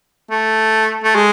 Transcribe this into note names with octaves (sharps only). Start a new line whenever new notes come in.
A3
A3
G#3